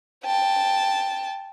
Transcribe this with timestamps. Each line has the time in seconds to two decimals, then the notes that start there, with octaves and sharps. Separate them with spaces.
0.24 G5 A5